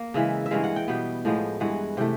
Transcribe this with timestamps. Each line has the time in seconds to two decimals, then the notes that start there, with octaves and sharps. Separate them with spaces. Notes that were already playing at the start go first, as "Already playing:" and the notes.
Already playing: A#3
0.14 C#3 E3 G#3 E5
0.46 E5
0.51 G2 E3 G#3 F5
0.64 F#5
0.76 G5
0.88 B2 G3 B3 G5
1.25 A2 F3 G#3 B3
1.60 G2 E3 G#3 F#5
1.97 C3 E3 A3 G5